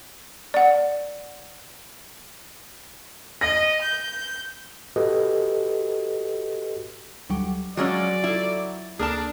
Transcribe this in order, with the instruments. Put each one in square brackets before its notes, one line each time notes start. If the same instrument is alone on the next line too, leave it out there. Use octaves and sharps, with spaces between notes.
[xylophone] D5 F#5
[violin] D#5 [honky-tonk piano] A#6
[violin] G6
[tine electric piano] F#4 G4 A4 B4 D#5
[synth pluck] D2 F#3 G3
[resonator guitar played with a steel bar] F3 G#3 C#4 [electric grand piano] F#3 [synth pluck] F#4 E6 [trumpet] D5
[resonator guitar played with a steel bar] E4 [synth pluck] F4 A4
[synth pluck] D2 A#3 [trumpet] D4 [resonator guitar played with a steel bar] G#4 A#4 A5